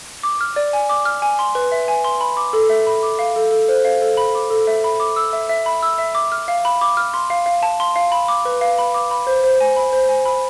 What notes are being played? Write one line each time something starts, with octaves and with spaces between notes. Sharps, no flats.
D6
F6
D5
G#5
D6
F6
G#5
C6
B4
E5
G#5
C6
B5
D6
A4
E5
B5
D6
F5
A4
A4
C5
F5
A4
B5
D6
A4
E5
B5
D6
E6
E5
E5
B5
E6
E5
D6
F6
F5
B5
D6
F6
C6
F5
F5
A5
C6
F5
B5
D6
B4
F5
B5
D6
B5
C5
C5
G#5
B5
C5
G#5
B5